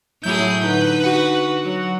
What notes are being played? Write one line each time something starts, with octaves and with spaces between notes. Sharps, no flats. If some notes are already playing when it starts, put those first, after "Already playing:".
A2 F#3 E4 G#4 G6
D3 D#4 B4
F#4 F#5
F#3